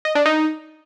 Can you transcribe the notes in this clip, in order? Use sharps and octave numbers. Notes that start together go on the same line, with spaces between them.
D#5
D4
D#4